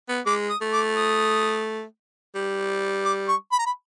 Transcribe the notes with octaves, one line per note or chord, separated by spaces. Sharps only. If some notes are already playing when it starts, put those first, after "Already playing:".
B3
G#3 D6
D#6
A3
D6
D#6
G3
D6
C#6
B5
A#5
B5